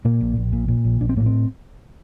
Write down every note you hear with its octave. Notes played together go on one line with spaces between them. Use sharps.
A#2 A#3
A#1
A#1
A#2
A#2
A#1
A#1 D4
C4
A2 A#3
C4